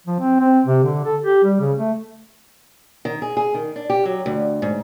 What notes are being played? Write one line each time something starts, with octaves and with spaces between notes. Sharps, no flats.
F3
C4
C4
C3
D3
A4
G4
G3
C#3
A3
D#3
G#4
G#4
D#3
D4
G4
F#3
D2
G#2